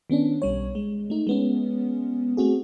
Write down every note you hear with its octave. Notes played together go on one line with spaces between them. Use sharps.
D#3 B3 C#4 D4
B1 G3 C#5
G#3
A3 D#4
G#3 B3 C#4
A3 C4 F#4 G#4